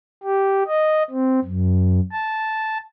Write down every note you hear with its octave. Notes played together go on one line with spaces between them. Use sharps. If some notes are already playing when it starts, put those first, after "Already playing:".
G4
D#5
C4
F#2
A5